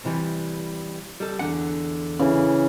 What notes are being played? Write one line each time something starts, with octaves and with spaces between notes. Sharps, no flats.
C3 E3 G3
G3 A4
E2 D3 F#5
C#3 E3